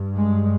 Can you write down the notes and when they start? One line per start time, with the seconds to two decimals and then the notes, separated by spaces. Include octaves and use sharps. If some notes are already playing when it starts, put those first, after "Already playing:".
Already playing: G2
0.15 G#3